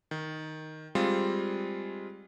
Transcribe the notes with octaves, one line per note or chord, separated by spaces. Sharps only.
D#3
G3 G#3 C4 F4